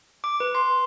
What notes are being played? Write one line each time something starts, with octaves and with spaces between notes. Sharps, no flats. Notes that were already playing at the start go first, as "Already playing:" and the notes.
D6
B4
C6